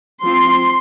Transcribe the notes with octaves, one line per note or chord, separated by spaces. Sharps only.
F3 C4 C6